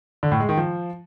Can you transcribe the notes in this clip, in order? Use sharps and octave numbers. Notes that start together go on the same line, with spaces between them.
D3
A2
G#3
D#3
F3